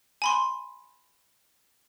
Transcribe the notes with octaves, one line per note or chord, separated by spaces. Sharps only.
G#5 B5 C6